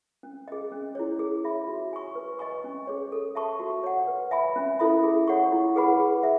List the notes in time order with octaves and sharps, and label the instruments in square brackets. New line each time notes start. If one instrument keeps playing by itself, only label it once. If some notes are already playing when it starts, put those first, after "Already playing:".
[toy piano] C#4
G#4 D#5
C#4
E4 G#4 C#5
G#4
C#5 E5 B5
F#4
C#5 G#5 C#6
B4
D#5 G#5 C#6
C#4
G#4 C#5
A4
E5 A5 C#6
F#4
C#5 F#5
B4
E5 G#5 B5
C#4
E4 A4 E5 B5
G#4
C#5 F#5 C#6
E4
G#4 B4 F#5 B5
G#4
E5